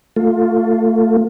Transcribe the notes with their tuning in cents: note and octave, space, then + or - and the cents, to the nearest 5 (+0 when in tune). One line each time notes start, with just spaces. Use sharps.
A3 +25 F4 +10